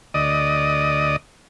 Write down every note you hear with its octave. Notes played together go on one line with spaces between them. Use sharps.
D2 D5 D#5 D#6